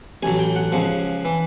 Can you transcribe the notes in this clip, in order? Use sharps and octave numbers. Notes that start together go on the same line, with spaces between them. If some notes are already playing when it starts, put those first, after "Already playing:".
A1 A2 F#3 G#5
G5
F#5
C#2 C#3 F3 F#5
E3